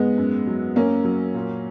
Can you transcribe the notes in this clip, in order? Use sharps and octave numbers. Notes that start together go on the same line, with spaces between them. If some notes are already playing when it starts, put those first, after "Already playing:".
Already playing: G#2 G#3 B3
F#2
F#3
F#2 A#3 C#4
F#3
A#2